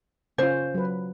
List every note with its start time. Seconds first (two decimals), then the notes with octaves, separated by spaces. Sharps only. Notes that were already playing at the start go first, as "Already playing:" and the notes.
0.38 C#3 C#4 F4 C5
0.74 F#3 B4